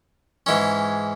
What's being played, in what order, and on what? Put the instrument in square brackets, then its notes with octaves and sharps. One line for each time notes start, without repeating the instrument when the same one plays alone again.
[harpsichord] G#2 E3 G#3 C#4